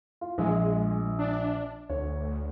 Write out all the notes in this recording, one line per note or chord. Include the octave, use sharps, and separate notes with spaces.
F4
A#1 G#3
D4
D2 C#5